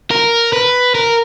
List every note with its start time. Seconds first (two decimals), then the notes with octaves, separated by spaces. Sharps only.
0.11 A#4
0.53 B4
0.95 A#4